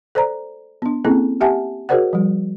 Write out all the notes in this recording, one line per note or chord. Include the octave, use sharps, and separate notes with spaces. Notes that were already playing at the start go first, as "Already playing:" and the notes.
A4 C5 D5 A#5
B3 D4
A#3 C4 C#4 E4 G#4 A4
G4 E5 F#5 G#5 A5
F#4 G#4 A#4 C5 D5 F#5
F3 G3